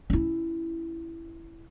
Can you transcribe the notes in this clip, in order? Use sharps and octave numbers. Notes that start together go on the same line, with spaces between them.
C#4 E4